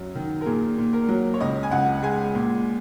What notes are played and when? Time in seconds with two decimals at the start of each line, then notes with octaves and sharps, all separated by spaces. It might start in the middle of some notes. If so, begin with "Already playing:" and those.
Already playing: F#2 F#3
0.15 D#3
0.41 A#4
0.46 A#2 G#4
0.78 A#2
0.93 A#4
1.09 F#3
1.34 C#5
1.40 C#2 D#5
1.63 G#5
1.71 C#2 F#5
2.03 G#3 G#5
2.35 A#2